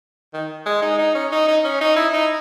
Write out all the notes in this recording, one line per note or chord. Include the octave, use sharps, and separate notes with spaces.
D#3
G#3
D#4
D#4
C#4
D#4
D#4
C#4
D#4
E4
D#4